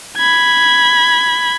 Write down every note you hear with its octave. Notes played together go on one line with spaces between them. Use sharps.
B5 G#6